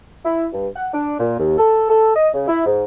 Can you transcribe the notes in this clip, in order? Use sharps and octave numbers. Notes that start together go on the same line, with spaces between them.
E4
G2
F#5
D4
A#2
D#2
A4
A4
D#5
C#3
E4
G#2